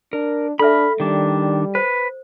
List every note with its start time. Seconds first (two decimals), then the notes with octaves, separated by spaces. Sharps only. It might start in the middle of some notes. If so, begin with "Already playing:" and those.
0.13 D4 A#4
0.59 D4 A4 E5 B5 F6
1.00 D#3 G3 D4
1.75 B4 C5